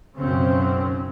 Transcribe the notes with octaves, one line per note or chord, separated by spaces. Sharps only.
B1 F#2 C#3 C4 C#4